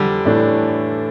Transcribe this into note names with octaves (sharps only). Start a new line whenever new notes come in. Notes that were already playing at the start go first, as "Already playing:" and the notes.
Already playing: F2 D3 E3 G3
A2 E3 A3 D4